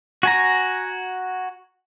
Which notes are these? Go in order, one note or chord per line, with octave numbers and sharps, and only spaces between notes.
F#4 G#5 A#5